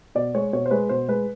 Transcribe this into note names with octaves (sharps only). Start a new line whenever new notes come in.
B2 D5
G#3 C#5
B2 C#5
C5
G#3 B4
B2 C5
G#3 B4